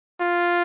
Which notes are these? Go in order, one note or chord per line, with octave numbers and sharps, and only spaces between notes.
F4